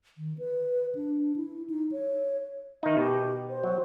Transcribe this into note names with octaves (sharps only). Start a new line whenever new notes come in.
D#3
B4
D4
E4
D#4
C#5
D#3 D#4 E5
B2 G4
C5
F#3